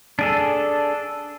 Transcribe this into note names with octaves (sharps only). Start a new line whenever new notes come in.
D4 G#4 A4